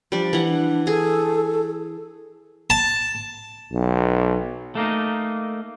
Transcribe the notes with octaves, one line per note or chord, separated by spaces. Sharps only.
F3 G3 D4
E3 F#5
D4
G#4 A4
A5
B1
A3 A#3 D#4